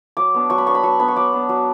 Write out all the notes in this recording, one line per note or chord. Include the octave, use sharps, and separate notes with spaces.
F#3 D6
B3 D4
F#3 C#6
B5
B3 D4 C#6
B5
F#3 C#6
B3 D4 B5
C#6
F#3 D6
B3 D4
F#3